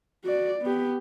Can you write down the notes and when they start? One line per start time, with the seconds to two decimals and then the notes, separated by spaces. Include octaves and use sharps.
0.24 F#4 D5
0.62 B3 G4